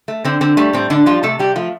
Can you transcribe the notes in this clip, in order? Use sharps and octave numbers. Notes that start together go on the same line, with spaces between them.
A3
D3 C4
D3 C4
G3 A3
A2 C4
A2 D3 D4
F3 G3 F4
C3 A3 A4
C3 G3 G4
F3 A3 F4